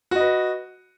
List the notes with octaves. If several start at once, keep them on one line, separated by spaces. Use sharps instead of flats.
F#4 B4 D#5